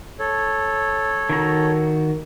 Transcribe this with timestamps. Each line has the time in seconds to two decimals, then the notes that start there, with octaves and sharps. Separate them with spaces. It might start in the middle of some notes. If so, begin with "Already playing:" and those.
0.19 A4 C#5
1.30 D#3 F#4 A#5